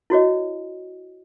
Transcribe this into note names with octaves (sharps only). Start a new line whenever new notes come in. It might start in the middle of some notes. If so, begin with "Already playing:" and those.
E4 F#4 C#5 D#5